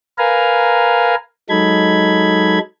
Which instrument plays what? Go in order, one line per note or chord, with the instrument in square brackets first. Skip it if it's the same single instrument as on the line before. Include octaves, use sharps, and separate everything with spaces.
[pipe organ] A#4 B4 F5 G#5 A#5
F#3 G#3 D#4 A4 B5 G#6